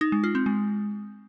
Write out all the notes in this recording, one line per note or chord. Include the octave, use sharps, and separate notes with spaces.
D#4
G#3
F4
C4
G#3